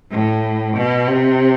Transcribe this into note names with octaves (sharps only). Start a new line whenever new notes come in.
A2
B2
C3